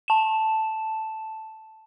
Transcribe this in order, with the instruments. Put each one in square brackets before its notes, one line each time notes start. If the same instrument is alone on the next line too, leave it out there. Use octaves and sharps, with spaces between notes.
[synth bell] A5 E7